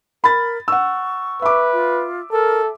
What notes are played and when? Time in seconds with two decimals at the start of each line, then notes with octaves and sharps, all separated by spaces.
0.24 A#4 B5 A6
0.68 F#5 C#6 E6
1.42 B4 E5 D6
1.73 F4
2.32 A4 A#4